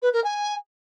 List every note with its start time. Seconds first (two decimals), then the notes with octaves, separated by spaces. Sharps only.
0.02 B4
0.13 A#4
0.24 G#5